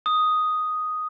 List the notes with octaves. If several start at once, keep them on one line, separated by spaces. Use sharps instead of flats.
D#6